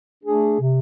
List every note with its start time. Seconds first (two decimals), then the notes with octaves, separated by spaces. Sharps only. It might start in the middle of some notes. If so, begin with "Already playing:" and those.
0.24 A3 D4 G#4
0.60 C3